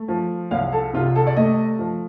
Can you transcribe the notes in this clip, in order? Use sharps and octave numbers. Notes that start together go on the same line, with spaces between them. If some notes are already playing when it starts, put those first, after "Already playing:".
Already playing: A3
F3
C2 F5
A4
C3 F4
A4
D5
A3 D#5
F3